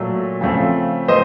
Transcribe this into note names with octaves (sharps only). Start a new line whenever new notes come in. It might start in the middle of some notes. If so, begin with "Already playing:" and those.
Already playing: A#2 F#3 A3
C#3 F3 A3 C4
F3 A3 C4 C5 D#5